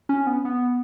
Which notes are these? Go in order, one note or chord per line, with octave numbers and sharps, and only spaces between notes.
C#4
B3
B3